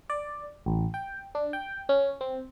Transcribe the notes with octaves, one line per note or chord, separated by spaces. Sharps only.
D5
A1
G5
D4
G5
C#4
C4